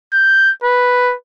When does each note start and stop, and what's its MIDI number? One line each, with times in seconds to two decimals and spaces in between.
0.13 0.52 91
0.64 1.15 71